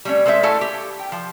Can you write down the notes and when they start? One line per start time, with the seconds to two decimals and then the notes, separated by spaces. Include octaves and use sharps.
0.05 G3 A3 C#4
0.26 G#3 A4 C5 D#5 E5
0.43 A3 E4 F#4 A4 F5 G#5
0.61 G4
0.99 G5
1.12 F3